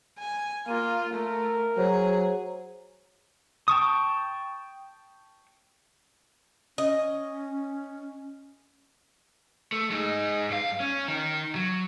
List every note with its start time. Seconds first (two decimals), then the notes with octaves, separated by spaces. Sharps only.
0.19 G#5
0.68 A#3 F4 D#7
1.14 A3 A#4
1.77 F#3 G#4 C5 C#5 A#5
3.68 G5 A5 C#6 D#6
6.78 C#4 D#5
9.72 A3
9.90 G#3 D#4
10.50 G2 F5
10.80 C#4
11.08 D#3
11.55 F#3